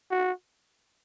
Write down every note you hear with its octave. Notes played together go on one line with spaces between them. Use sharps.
F#4